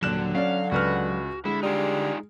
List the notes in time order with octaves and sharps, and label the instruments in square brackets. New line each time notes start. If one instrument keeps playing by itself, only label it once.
[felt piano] D#1 F#6 E7 [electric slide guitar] D3 [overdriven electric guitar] F#3
[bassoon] D3 [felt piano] C#4 D5 [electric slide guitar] F5
[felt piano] C#2 B4 F6 [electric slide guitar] F#4
[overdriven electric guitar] D3 [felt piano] G#3 [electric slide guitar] E4
[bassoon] G3 [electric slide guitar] D#4 F4 G#4